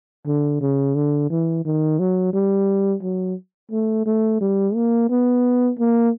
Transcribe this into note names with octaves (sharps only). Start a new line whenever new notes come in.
D3
C#3
D3
E3
D#3
F#3
G3
F#3
A3
A3
G3
A#3
B3
A#3